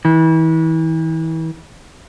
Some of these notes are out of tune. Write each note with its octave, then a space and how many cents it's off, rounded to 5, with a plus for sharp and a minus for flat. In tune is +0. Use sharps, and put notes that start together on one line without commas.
E3 -35